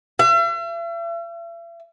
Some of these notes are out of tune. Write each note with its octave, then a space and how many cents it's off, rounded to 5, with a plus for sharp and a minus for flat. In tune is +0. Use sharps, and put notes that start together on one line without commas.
E5 +45